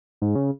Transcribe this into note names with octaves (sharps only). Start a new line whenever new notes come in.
G#2
C#3